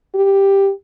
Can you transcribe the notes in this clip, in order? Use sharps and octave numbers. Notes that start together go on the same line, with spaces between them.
G4